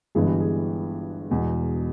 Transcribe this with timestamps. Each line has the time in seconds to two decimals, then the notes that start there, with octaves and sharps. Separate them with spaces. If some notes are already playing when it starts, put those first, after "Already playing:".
0.15 G1 G2 E3 G#3 B3 G#4
0.28 G4
0.40 G#4
1.30 E1 E2 B2